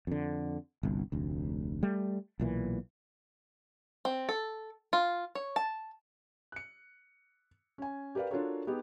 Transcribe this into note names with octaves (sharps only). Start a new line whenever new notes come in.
F2 D3
G1 C2
F1 D2
G3 A3
B1 A#2 E3
C4
A4
F4
C#5
A5
F#6 C#7
C#4 G#5
G4 A#4 B4 D5 F5
D4 F4 F#4 A4 A#4 C#5
B3 D#4 G4 G#4